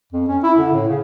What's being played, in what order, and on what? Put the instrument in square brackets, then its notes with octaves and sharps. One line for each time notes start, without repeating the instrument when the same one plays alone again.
[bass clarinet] F2
C#4
E4
D3
A2
C#3